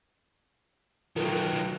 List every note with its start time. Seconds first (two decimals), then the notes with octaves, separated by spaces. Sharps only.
1.16 D#3 F#3 F4 A4 A#4
1.33 F#6